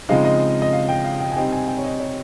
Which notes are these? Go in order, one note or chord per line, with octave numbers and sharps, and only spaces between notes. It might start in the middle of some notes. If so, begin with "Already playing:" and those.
C#3 F3 G#3 C4 D#4 F5
D#5
D#5
F5
G5
F5
G5
G#5
C3 G3 C4 D#4 G5
G#5
G5
C#5
D#5
C#5